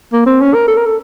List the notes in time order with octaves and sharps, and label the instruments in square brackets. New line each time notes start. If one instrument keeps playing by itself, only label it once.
[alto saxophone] A#3
C4
C#4
A#4
A4
A#4
A4